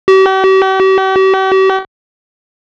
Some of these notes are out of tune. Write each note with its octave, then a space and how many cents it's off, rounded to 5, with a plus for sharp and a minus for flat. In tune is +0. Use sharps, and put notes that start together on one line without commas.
G4 -45